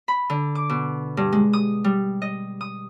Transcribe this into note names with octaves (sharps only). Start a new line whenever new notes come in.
B5
D3
D6
B2
G2
G#3
D#6
G3
D#5
D#6